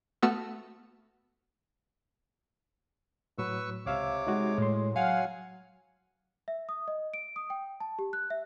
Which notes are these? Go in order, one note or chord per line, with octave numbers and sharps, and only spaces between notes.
A3 B3 F#4 E6 F6 C#7
A2 F#3 B4 C#6 E6
C#2 C3 C#5 F5 D6 E6
G#3 D#4 F#4
A2 C#5 C6
F#3 F5 F#5 G#5
E5
D#6
D#5
D7
D#6
G5
A5
G4
F#6
E5